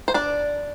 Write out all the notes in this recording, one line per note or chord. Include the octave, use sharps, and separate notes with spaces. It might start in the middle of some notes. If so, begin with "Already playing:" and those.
C5
D4 D5